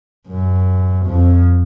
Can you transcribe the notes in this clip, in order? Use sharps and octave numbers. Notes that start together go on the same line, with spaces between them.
F#2
F2